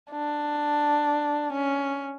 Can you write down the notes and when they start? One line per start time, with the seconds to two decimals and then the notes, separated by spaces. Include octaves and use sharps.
0.11 D4
1.53 C#4